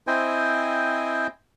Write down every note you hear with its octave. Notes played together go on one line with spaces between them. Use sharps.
C4 E4 C5 D#5 G5 G#5